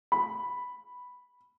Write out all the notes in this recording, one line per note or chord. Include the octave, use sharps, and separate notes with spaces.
B5